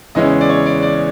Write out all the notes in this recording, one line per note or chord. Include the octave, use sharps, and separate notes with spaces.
E2 C#3 E3 G#3 C#4 D#5
D5
C#5
D5
D5